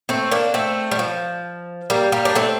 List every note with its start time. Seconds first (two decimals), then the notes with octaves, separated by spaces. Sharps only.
0.09 A3 C4
0.31 A#3 D4
0.54 A3 C4
0.91 G3
0.99 F3
1.90 G3 A#3
2.12 G3 A#3
2.25 D4
2.35 A3 C4